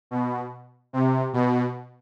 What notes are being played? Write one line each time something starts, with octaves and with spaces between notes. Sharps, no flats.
B2
C3
B2